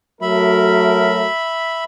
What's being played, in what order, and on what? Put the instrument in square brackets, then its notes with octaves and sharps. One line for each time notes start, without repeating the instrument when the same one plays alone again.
[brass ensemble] F#3 A3 A#4 [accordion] E5 B5